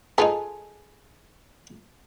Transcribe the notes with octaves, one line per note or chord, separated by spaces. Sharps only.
D#4 F4 G#4 A4 B4